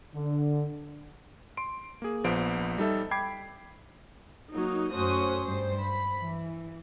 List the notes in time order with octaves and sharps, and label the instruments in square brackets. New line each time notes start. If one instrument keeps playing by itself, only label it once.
[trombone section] D3
[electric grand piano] C6 D7
A#3 G#4
A#1 F3 B3 C5 D7
G3 D#4 A4 E5
G5 B5 D6 G#6 C7
[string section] F#3 A#3 D#4
F#2 A3 C#4 F#4 C5 D#6
G2 C5
B5
E3